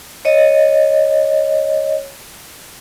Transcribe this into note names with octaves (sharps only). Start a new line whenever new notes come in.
C#5 D#5